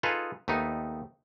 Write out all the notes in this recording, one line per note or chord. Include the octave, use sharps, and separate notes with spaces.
D#4 F4 G#4 A4 B4
D#2 A3 B3 D#4